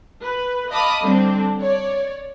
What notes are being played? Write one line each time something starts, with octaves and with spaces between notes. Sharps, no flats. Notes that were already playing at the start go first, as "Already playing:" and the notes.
B4
D#5 F5 A5 B5 D6 D#6
D3 G3 C4 D4
C#5 D5